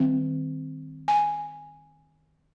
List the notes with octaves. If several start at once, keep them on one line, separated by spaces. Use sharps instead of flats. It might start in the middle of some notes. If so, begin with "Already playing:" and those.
Already playing: D#3 G3 C4
G#5